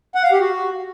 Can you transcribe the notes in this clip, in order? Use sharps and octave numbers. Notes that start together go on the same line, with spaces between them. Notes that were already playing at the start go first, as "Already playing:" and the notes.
F#5
F5
G4
F#4